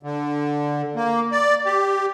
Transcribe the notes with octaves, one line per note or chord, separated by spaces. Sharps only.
D3
A#3
D5
G4